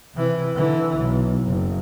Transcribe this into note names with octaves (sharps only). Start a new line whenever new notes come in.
C3 E3
D3 E3
B1
F#1